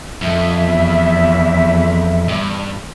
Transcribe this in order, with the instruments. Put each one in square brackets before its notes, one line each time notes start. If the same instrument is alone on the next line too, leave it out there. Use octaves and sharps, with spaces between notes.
[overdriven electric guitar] F2 [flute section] E5
[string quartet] E2
[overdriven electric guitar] G2